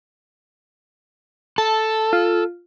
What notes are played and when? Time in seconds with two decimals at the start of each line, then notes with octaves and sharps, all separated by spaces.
1.58 A4 A5
2.13 F4